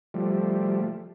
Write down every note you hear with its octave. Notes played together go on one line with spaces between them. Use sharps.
F3 G3 A3